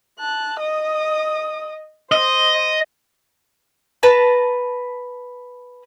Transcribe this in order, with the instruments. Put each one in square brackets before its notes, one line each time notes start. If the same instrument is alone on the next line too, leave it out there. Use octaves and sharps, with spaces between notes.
[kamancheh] A5 F#6
D#5 D#6
[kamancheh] C5 [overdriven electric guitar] D#5
[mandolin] B4 A5 A#5